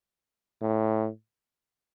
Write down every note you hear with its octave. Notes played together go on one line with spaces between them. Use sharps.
A2